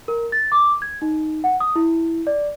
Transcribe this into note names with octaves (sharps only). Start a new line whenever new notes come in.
A#4
A6
D6
G#6
D#4
F#5
D#6
E4
D5